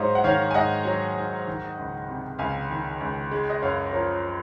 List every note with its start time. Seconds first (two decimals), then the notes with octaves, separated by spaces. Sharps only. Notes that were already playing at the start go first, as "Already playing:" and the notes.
Already playing: G#2 F#3 C5 C#5 D#5 F5
0.15 F#5
0.24 D#3 C#5 F5
0.51 G#5
0.54 G#2 D#5 F#5
0.85 F#3
1.16 G#2
1.47 D#3
1.78 C#2
2.08 C3
2.39 C#2 F5 G#5
2.70 D#3
3.01 C#2
3.31 G#3
3.50 D#5
3.62 F#2 C#5 F5
3.92 F3 A#4 C#5